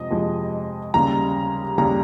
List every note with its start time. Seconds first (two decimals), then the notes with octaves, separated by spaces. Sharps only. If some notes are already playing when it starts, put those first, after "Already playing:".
Already playing: F2 C3 F3 G#3 D#5
0.11 F2 C3 F3 G#3
0.94 D#2 C#3 G3 A#5
1.78 D#2 C#3 G3 A#5